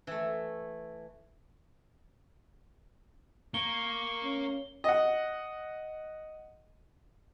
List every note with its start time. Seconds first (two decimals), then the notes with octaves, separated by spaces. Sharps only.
0.07 E3 A3
3.54 A#3 C#6 G7
4.24 C#4
4.84 D#5 F#5